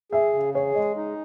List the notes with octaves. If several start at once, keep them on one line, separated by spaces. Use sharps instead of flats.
G#4 E5
C#3
G#4 C#5
G#3 D#5
D#4